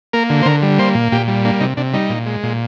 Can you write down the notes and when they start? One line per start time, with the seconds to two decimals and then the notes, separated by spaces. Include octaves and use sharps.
0.13 A#3 A#4
0.30 D3
0.43 C5
0.46 D3 A#4
0.62 G3
0.78 A#3 C5
0.95 A#2
1.12 A#2 G4
1.28 G3
1.45 A#3 D4
1.60 C3 D#4
1.77 C3 D4
1.93 G3 D#4
2.10 A#2
2.26 G#3
2.43 A#2